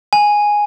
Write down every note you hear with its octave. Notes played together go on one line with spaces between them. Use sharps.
G#5